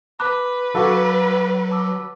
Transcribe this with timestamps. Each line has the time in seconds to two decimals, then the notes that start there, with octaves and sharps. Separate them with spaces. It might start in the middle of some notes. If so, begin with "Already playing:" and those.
0.20 B4 B5 D6 F#6
0.75 F#3 F#4 A4 F5 D6
1.71 A5 D6 E6